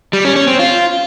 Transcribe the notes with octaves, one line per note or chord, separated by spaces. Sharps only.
G3
C#4
C#4
C4
F4